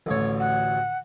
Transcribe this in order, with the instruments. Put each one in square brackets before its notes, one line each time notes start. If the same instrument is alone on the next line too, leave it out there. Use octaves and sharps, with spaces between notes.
[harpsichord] A1 D2 C#5
[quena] F#5